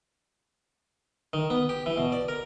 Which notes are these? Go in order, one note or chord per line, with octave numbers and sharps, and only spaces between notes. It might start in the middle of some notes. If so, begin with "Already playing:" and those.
D#3
B3
G4
E3
B2
D5
A#4